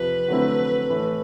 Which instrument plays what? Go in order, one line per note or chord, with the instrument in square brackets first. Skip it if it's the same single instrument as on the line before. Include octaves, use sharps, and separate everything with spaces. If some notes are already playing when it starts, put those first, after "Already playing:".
Already playing: [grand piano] F2 C3 F3 [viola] B4
[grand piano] D3 F#3 A3 C4 E4
A2 E3 A3